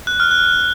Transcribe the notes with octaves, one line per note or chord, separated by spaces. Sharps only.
F#6
F6
F#6